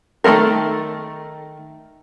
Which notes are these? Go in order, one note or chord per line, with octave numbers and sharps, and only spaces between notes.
D#3 A3 A#3 A4 A#4